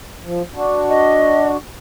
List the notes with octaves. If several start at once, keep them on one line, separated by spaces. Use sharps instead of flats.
F3
D4 F#4
D#5